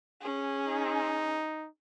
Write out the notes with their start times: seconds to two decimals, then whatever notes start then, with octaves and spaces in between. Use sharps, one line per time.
0.21 C#4 G#4
0.67 D#4